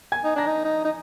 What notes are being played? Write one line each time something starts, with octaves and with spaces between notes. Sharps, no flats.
G#5 G#6
D#4
D4 A#5 A#6
D#4
D#4
D#4